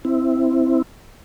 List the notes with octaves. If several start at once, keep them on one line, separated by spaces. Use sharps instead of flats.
C4 E4